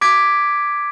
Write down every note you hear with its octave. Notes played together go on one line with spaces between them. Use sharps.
D6 G#6 B6 D7